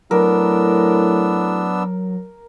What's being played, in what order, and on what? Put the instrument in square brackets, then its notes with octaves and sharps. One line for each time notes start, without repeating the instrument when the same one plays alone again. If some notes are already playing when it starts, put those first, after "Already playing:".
[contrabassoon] A2 [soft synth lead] F#3 [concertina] B3 D4 E6 [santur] A#4